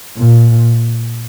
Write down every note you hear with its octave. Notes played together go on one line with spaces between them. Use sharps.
A#2